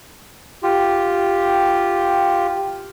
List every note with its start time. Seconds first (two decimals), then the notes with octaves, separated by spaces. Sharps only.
0.63 F4 G4